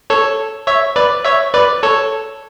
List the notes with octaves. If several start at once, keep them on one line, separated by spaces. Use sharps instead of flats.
A4 C#5
C#5 E5
B4 D5
C#5 E5
B4 D5
A4 C#5